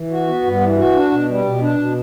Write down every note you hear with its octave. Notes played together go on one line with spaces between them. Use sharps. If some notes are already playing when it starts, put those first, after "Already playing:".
Already playing: E3
F#4
B3
G2
E3
F#4
D4
B2
G3
B2
D4
B2